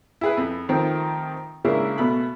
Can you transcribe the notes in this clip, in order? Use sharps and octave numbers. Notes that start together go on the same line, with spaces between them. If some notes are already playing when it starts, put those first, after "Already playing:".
E4 G#4 B4
F2
C3 D#3 F3 A3 C4
C#3 G#3 A#3 D4 E4 A#4
B2 A3 B3 B5